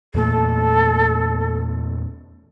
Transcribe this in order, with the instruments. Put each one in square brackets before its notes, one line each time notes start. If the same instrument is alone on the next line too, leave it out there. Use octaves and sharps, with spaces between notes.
[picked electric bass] E2 A#2 A3 [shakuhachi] A4